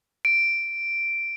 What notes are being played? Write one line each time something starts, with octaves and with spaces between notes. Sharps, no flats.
D7